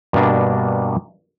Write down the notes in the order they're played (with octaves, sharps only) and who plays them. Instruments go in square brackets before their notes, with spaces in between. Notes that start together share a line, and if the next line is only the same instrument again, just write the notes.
[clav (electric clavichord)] G2 B2 A#3 D4